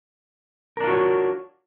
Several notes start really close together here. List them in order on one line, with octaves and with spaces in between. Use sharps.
A#4 D4 F4 F#4 C#5